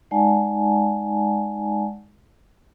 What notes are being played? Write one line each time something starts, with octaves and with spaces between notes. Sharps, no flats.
G#3 D#4 D5 F#5 G#5 A5